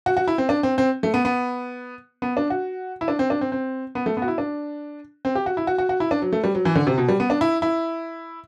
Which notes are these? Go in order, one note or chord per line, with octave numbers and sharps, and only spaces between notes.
F#4
F#4
E4
C4
D4
C4
C4
A3
B3
B3
B3
D4
F#4
E4
D4
C4
D4
C4
C4
B3
A3
B3
F#4
E4
D4
C4
G4
F#4
E4
F#4
F#4
F#4
E4
D4
F#3
A3
G3
F#3
E3
D3
C3
B2
G3
B3
D4
E4
E4